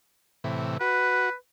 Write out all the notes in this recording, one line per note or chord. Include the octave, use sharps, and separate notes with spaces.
A2 C3 E3
F#4 B4